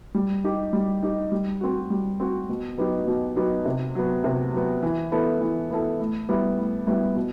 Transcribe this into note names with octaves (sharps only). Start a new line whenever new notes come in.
G3
D#4 G4
G3
D#4 G4
G3
C4 F#4
G3
C4 F#4
B2
F#3 B3 D#4 G4
B2
F#3 B3 D#4 G4
C3
F#3 B3
C3
F#3 B3
E3
B3 E4 A4
E3
B3 E4 A4
A2
G3 B3 E4
A2
G3 B3 E4
B2